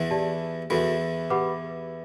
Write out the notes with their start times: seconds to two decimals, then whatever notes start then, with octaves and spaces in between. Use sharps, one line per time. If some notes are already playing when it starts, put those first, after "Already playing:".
Already playing: E2 E3
0.11 G4 D5 A5
0.70 E2 E3 F#4 A4 E5 B5
1.30 G4 B4 F#5 B5 D6